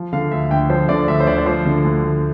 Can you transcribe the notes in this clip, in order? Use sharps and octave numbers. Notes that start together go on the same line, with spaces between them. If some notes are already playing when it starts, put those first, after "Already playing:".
Already playing: F3
D3 F5
D2 E5
D2 G5
F3 C5
D3 D5
D2 E5
C5
D2 D5
D5
F3 C5
D3
D2
D2